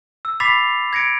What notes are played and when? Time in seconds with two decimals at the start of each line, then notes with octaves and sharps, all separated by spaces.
0.25 E6
0.40 B5 D6 A6 B6 C7 F7
0.93 G#6 A#6 C#7 D7